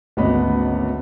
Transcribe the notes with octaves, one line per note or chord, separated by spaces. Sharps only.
G#1 D2 B3 C#4 D#5 B5